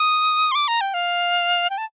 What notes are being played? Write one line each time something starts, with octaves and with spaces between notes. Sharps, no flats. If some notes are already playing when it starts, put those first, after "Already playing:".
Already playing: D#6
C6
D6
A#5
G5
F5
G5
A5